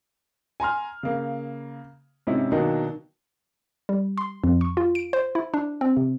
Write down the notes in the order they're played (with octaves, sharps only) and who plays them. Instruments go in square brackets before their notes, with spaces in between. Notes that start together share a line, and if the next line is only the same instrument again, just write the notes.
[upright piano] G#5 A#5 C6 F6
C#3 A#3
G#2 C3 C#4 D#4 E4
B2 D#3 F#3 A#3 D4 D#4
[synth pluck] G3
C6
F2
C#6
F4
D7
C5
E4
D4
C4
C3